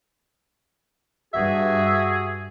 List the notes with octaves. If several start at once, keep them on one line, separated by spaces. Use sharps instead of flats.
G2 F#4 G#4 E5